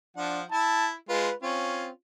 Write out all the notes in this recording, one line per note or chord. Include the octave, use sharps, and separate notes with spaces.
F3 D4 F#5
E4 A5
G#3 F4 B4
C4 C#4 F4